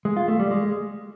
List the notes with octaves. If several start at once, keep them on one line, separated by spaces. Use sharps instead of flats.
G#3
F4
A3
G3
G#3